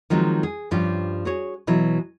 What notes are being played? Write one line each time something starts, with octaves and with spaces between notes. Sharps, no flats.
D#3 F3 F#3 G#3 C4
G#4
G2 F3 C#4 G4
F#4 G#4 C#5
B2 E3 F#3